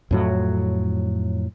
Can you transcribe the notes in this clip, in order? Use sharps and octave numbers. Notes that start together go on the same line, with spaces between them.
F2 A2 F#3